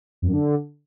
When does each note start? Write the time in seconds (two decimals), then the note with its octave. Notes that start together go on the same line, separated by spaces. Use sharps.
0.22 F2
0.27 F#2
0.33 D3